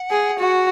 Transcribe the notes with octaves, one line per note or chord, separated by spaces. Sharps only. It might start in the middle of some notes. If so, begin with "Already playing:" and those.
Already playing: F#5
G#4
F#4